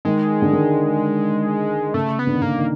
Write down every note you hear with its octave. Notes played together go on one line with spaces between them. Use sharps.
D#3 G#3
D3
D#3
C#3 A3
B3
D3
D#3
D3 A#3
D#3